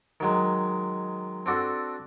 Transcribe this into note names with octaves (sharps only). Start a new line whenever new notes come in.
D#3 F#3 G#3
C4 D4 F#4 A4